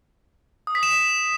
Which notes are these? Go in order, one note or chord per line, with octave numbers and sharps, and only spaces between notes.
D#6
B6
E7